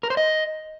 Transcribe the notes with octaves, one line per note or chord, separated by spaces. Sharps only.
A#4
C5
D#5